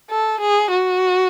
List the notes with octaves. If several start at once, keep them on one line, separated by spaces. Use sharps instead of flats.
A4
G#4
F#4